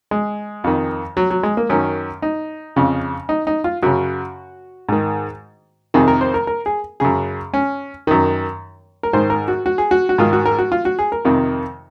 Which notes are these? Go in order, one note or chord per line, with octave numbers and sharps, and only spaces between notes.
G#3
F2 D#3
F#3
F#3
G#3
A#3
F#2 D#3 C#4
D#4
F2 C#3
D#4
D#4
F4
F#2 C#3 F#4
G#2 D#3
F2 C3 D#3 G#4
A#4
C5
A#4
A#4
G#4
F#2 C#3 G#4
C#4
F#2 D#3
A#4
G#2 D#3 C5
A#4
F#4
F#4
G#4
F#4
F#4
G#2 D#3 F4
F#4
A#4
F#4
F4
F#4
G#4
A#4
F2 C3 D#3